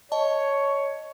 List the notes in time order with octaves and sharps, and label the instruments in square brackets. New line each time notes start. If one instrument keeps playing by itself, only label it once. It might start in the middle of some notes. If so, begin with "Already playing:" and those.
[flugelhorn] C#5 [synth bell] D#5 A5